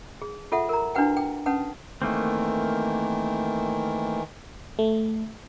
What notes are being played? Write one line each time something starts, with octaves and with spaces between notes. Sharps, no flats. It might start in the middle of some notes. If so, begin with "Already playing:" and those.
G#4
F4 A4 E5 F#5
A#4 A#5
D4 E4 F#4 B4 F#5 G5
G5
C#4 B4 F#5 A5 D#6
D#3 E3 A3 A#3 C4
A3